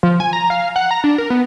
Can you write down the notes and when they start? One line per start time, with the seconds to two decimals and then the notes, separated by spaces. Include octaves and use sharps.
0.03 F3
0.20 G#5
0.33 A#5
0.50 F5
0.76 F#5
0.91 A#5
1.04 D4
1.18 A#4
1.30 B3